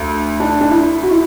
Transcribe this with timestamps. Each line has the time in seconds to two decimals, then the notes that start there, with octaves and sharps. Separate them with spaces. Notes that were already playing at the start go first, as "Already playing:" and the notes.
Already playing: D2
0.40 D4
0.61 D4
0.71 E4
1.03 F#4
1.11 E4